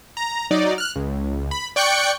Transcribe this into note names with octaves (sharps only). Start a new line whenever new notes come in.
A#5
F#3 D#4 D5
F6 F#6
C#2
B5
D5 G5 C#6 F#6 G6 C#7